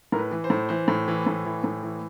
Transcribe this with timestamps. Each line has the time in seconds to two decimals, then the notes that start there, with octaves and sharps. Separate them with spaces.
0.12 A2 A#4
0.19 B4
0.31 E3
0.44 C5
0.50 A2
0.69 E3 C5
0.88 A2
1.08 E3
1.27 A2
1.46 E3
1.64 A2
1.83 E3